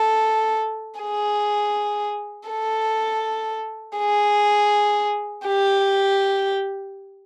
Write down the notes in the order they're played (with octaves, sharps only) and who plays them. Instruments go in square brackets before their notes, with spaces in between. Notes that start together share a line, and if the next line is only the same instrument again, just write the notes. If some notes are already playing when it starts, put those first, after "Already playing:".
Already playing: [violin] A4
G#4
A4
G#4
G4